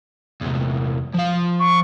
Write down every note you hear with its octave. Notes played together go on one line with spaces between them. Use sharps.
E2 C3
F3 F5
C#6